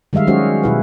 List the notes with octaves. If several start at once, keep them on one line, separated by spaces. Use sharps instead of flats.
D#3 G3 G#3 E5 F5
F#3 G#3 C#4 F#4 G#4 C5
B2 E4 B4